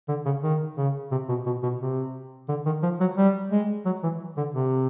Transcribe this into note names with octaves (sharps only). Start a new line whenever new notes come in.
D3
C#3
D#3
C#3
C3
B2
B2
B2
C3
D3
D#3
F3
F#3
G3
G#3
F#3
E3
D3
C3